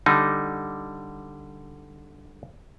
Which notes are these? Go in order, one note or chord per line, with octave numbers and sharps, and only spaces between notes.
D3 G3 D#4